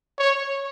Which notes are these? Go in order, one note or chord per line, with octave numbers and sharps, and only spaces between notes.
C#5